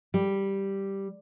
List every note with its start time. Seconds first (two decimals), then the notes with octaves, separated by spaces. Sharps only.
0.14 G3